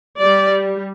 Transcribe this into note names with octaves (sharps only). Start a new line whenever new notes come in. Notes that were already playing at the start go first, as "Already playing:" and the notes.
G3 D5